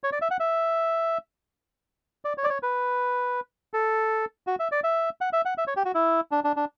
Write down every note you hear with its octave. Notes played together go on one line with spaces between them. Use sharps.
C#5
D5
E5
F#5
E5
D5
C#5
D5
C#5
B4
A4
F#4
E5
D5
E5
F#5
E5
F#5
E5
C#5
G4
F#4
E4
D4
D4
D4